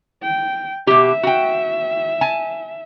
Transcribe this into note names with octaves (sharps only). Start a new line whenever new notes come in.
G5
B2 G4 E5
F#4 G5
G#5 A5